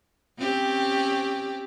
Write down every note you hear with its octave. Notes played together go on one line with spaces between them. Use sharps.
C4 C#4 G4